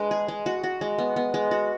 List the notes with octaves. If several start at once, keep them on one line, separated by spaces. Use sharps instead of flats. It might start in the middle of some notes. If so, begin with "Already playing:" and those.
Already playing: G#3 D4 B4
G#4
G#3
F#4
F#4
G#3
B3
B3
G#3
F#4